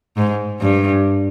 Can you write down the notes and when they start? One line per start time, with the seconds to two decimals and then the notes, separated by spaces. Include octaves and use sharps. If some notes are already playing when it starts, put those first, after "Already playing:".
0.17 G#2
0.61 G2